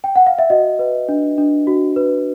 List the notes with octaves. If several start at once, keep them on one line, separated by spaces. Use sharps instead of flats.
G5
F#5
F5
E5
F#4 D#5
B4
D4
D4
F#4
B4